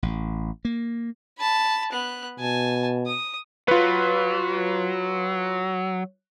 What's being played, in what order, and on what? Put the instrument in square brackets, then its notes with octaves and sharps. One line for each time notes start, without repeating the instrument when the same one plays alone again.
[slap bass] A1
A#3
[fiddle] A5 B5
B3 F#6
[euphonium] B2 [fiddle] G#5 A5
[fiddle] D#6
[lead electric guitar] F#3 [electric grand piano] F4 B4